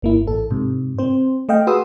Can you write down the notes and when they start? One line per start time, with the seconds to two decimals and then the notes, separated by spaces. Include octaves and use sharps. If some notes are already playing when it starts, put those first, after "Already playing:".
0.02 G1 A#3 E4
0.27 A1 A4
0.51 G#2 C3
0.99 C4 C5
1.49 A3 D#5 F5 G5
1.67 F#4 G#4 B4 C6 D#6 E6